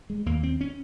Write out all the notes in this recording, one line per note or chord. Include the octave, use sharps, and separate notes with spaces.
G#3
D#2 A#3
C4
C#4